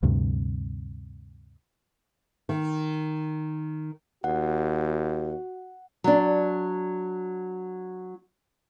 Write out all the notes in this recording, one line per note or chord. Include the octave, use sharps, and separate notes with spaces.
D2 G2 C3
D#3
D#2 F#4 F#5
F#3 D4